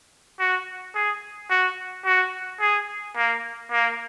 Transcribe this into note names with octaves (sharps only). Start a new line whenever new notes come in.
F#4
G#4
F#4
F#4
G#4
A#3
A#3